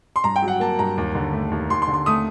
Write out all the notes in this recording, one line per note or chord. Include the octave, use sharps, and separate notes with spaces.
C6
G2 A#5
G5
F#3
F#5
A#3 A5
G2 A#5
D#2
D3
A3
D#2
D#2 C6
C6
D3
C6
A3 D#6